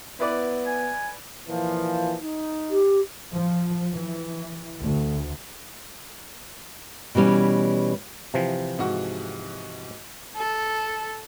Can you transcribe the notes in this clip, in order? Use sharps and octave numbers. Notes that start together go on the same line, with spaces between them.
B3 E4 B4 D5
G#5
A#2 E3 F3
D#4
G4
F3
E3
D2
B2 E3 G3 C#4
C3 E3 F3
G#2 F#4
A4